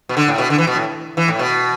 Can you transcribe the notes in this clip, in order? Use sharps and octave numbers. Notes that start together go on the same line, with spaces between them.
B2
D3
A2
B2
D3
E3
B2
A2
E3
A2
B2